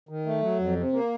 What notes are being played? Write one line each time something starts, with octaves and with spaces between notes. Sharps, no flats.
D#3
A3
F#3
F2
C3
A#3